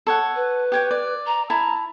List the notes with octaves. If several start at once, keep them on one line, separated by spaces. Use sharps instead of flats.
A4 C#5 F#5
B4
G4 C#5 G5
D5
A#5
E4 A5 A#5